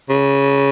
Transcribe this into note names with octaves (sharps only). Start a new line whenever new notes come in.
C#3